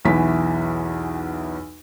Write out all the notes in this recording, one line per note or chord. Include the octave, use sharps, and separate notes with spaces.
B1 E2 E3 B6